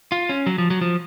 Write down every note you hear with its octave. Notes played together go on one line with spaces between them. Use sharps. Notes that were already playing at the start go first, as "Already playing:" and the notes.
F4
C#4
F#3
F3
F#3
F3